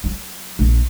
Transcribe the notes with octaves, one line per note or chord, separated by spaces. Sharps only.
F#3
A#1